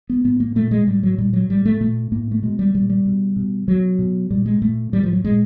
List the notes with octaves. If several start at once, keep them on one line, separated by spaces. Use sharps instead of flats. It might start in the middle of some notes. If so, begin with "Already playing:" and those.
B3
A2 B3
A#3
A#2 A3
G#3
A2 G3
F#3
A#2 G3
F#3
A2 G3
A3
A#2 A3
A2 A#3
A3
B2 G#3
G3
A#2 G3
G3
B2
B2
B2 F#3
B2
A#2 G3
G#3
A#2 A3
A2 G3
F3
F#3
A#2 G#3